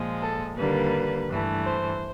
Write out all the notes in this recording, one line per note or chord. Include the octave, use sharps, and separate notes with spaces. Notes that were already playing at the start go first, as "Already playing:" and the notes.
Already playing: A#2 F3 G#3
A4
D#2 D3 G3 A#3 B4
G2 E3 A3
C5